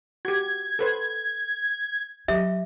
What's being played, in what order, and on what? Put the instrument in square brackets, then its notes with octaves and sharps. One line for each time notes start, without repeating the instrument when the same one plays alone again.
[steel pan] F#4 G4 [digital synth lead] G#6
[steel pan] A4 B4 C5
[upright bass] F#3 [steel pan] G4 D#5 [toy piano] E5